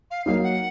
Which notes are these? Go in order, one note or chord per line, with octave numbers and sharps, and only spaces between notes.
F5
F#3 A#3 D#4 F5
F#5